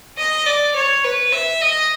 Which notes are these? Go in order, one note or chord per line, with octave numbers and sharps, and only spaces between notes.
D#5
D5
C#5
B4
E5
D#5